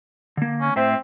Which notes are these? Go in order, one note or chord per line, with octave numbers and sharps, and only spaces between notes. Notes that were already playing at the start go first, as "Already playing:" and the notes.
D3 A#3
C#4
A2 C4 C5 E5